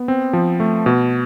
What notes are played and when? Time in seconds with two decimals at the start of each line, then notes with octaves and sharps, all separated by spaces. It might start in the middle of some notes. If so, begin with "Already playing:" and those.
Already playing: B3
0.08 C4
0.33 F3
0.60 A3
0.86 B2